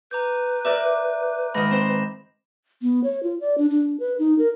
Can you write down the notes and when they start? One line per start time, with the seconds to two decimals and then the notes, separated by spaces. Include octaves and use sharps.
0.11 B4 A#5 D6 G6
0.65 A#4 D5 E5 D6
1.54 G#2 D#3 D#5 B5 A#6
1.71 C4 C5 E7
2.82 B3
3.04 C#5
3.23 F4
3.41 D5
3.58 D4
3.70 D4
4.00 B4
4.19 D#4
4.38 A#4